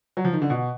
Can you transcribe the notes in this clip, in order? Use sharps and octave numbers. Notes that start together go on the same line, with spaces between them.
F#3
F3
D#3
D3
B2